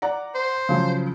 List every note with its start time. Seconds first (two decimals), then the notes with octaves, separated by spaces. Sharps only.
0.02 D5 F#5 A#5
0.35 C5
0.69 C#3 F3 F#3